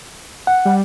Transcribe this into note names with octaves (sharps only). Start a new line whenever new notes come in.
F#5
G3